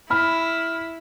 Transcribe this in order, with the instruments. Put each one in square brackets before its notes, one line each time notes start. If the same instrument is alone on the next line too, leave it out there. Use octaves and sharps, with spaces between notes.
[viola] E4 [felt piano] B5 F6